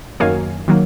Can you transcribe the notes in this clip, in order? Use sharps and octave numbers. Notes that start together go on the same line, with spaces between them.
F#2 D#3 F#3 A#3 F5 G#5
D#3 F#3 A#3